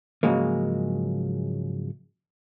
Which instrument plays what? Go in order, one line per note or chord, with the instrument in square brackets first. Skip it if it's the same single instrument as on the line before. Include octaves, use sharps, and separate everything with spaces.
[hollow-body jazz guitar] G#2 C#3 F3 F#3 G#3 A#3